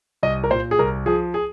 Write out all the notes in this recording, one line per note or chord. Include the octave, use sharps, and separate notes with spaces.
C2 D#5
A#4
A#2 C5
G#4
C2 A#4
F3 G#4
G#4